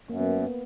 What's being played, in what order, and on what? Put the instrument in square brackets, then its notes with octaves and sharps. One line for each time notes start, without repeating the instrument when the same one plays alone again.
[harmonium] F#2 [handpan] A#3
[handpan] B3
A#3
B3